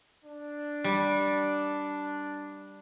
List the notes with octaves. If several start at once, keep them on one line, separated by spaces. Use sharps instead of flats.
D4
G3